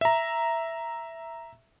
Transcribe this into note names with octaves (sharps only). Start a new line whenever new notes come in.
E5 A#5